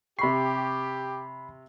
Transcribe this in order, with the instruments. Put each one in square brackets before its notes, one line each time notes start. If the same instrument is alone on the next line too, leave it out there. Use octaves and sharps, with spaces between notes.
[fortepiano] C3 C#6 [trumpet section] G4 [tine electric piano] B5 C7